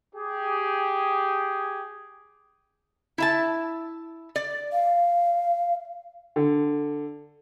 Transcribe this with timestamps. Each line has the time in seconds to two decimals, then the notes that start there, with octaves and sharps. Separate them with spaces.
0.14 G4 G#4
3.18 E4 E5 A5
4.36 D5
4.73 F5
6.36 D3